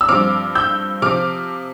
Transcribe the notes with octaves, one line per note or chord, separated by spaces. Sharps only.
E6
G2 F3 C4 D6 F6
E6 G6
C3 F3 C4 D6 F6